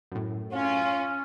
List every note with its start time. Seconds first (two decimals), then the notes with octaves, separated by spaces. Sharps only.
0.12 F#2 A2
0.52 C#4 F4